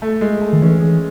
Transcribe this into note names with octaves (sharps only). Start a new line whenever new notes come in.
A3
G#3
A3
D#3
E3 C#4
G#4